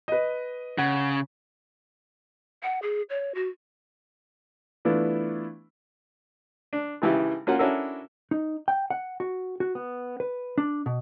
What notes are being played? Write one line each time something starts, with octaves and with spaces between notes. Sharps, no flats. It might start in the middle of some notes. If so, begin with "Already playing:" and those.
B4 D#5
C#3 F#5
F#5
G#4
C#5
F#4
E3 A3 B3 D4 E4 F4
D4
G#1 C#3 E3 E4 G4
A#3 C#4 F4 F#5
C#4 D4 E4 F#4 A4 A#4
D#4
G5
F#5
F#4
F#4
B3
B4
D4
B2